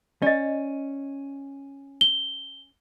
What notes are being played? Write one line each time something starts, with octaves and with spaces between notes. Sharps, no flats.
C#4 D5 D#5
G7